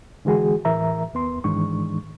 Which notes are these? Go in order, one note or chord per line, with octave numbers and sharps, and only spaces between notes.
D3 E3 G#3 F#4 G#4
A2 E3 A#4 E5 A#5
D#2 B3 C6
G#2 D#3 E3 G#3 D4 C#6